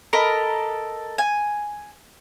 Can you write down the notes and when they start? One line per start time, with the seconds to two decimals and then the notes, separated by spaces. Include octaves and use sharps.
0.13 A4 A#4 D#5 B5
1.18 G#5